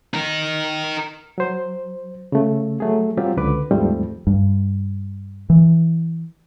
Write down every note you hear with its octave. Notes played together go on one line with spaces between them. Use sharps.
D#4 A#4
F#3 C5
C#3 A3
F#3 A3 G#4
F#3 G3 C4 F4 G4
C#2 D3 B4 D6
D#2 G#2 F3 G3 A3 C4
G2
E3